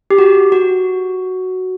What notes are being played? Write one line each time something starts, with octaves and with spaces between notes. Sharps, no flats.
G4
F#4
F#4